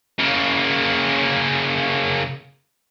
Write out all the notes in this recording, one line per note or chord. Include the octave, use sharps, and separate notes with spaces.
C#3 A#3